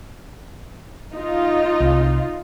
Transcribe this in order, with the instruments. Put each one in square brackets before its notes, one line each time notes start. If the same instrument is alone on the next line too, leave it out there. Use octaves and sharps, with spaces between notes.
[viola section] D#4 F4
[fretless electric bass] C2